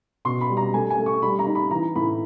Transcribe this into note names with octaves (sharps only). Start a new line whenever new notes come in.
B2 C6
B5
G3
A#5
A3 G#5
G#5
A3
C#6
G3 B5
A#5
D#4
B5
E3 A#5
A2 B5